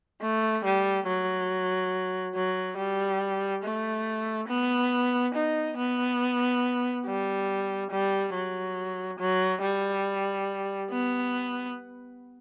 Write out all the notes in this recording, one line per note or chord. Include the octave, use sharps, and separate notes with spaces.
A3
G3
F#3
F#3
G3
A3
B3
D#4
B3
G3
G3
F#3
F#3
G3
B3